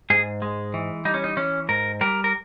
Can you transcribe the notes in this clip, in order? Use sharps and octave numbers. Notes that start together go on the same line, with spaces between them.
G#2 G#4
G#3
E3
G3 D#4
C#4
D#4
E3 C#4
G#2 A#4
G3 A#4
A#4